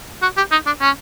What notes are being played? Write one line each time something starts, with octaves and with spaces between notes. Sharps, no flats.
F#4
G4
D#4
D4
C#4